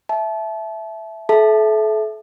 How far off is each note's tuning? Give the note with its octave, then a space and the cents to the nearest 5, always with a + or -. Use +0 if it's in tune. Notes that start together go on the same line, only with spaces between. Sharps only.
E5 +0 A5 -30
A4 -35 E5 +0 A5 +0